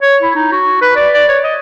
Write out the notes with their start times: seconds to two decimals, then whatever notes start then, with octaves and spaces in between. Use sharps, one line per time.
0.02 C#5
0.22 E4
0.36 D#4
0.52 F#4
0.81 B4
0.96 D5
1.14 D5
1.29 C#5
1.44 D#5